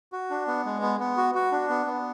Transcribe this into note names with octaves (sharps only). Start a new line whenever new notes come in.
F#4
D4
B3
G#3
B3
B3
F#4
F#4
D4
B3
B3